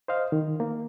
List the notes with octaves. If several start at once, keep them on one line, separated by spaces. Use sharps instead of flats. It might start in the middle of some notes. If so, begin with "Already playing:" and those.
C5 D#5 F5
D#3
A#3